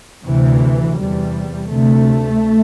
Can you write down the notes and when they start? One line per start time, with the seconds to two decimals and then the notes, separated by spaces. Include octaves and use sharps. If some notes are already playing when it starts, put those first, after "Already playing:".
0.25 D2 C3 E3
0.98 E2 C3 G3
1.71 D2 C3 A3